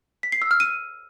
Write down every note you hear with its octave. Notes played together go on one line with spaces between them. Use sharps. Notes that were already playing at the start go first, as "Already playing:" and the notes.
B6
C7
E6
F6
D#7